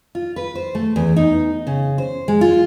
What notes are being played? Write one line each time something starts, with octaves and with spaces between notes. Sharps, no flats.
F4
B4
C5
A3
E2
D#4
C#3
C5
G#3
F4